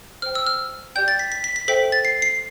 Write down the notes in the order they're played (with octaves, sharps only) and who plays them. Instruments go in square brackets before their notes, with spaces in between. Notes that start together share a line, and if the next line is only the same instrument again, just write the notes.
[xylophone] C5 G5 F6
E6
F6
G4 D5 G5 G6
A6
B6
B6
B6
B6
A4 C5 E5 G5 B6
A6
C7
C7